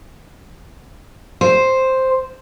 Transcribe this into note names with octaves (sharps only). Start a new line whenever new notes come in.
C5